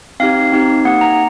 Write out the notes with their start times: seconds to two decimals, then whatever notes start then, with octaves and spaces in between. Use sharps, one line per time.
0.20 C4 D#4 G4 F5
0.52 C4 D#4 G4
0.85 A#3 D#4 G4 F#5
1.01 A#5